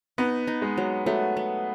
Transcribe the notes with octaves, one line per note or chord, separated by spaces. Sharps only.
B3 D#4
D#4
G#3
F#3
F#3 A3
B3